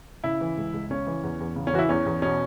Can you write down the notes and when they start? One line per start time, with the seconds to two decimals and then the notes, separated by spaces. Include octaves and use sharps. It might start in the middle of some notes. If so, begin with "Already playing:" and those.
0.24 C#3 E4
0.41 E3
0.57 C#2
0.73 C#2
0.90 C#3 C#4
1.07 E3
1.23 E2
1.40 E2
1.56 C#3
1.67 C#4
1.74 E3 F#4
1.79 E4
1.89 E2 C#4
2.06 E2
2.22 B2 C#4